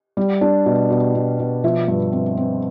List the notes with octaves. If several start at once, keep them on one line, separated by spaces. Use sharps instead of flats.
G3
D4
B2
B2
B2
B2
F3 E5
G2
C4
C4